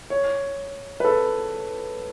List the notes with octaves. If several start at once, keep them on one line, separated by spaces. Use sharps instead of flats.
C#5
B4
A4